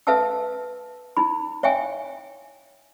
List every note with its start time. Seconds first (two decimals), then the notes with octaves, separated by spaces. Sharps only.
0.07 A4 B4 E5 F5 A5 E6
1.17 D#4 E4 B5
1.63 C#5 E5 F5 G5 G#5